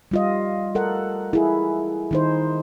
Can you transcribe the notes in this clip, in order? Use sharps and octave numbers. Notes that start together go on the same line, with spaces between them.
G3 F4 D#5
A4 A#4 F#5
E4 G#4
D#3 D#4 C5